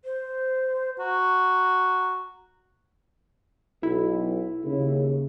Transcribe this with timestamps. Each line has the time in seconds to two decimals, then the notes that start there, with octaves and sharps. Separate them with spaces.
0.05 C5
0.99 F#4 A#5
3.83 B1 E4
4.65 D#2 C#3